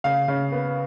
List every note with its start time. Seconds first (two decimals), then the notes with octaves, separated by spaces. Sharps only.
0.04 C#3 F5
0.28 C#3
0.52 B3